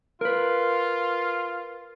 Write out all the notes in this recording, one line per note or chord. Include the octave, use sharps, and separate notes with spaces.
F4 A#4 B4